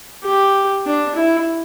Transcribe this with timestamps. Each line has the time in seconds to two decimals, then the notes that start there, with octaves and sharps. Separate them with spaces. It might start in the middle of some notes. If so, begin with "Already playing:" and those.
0.24 G4
0.86 D4
1.15 E4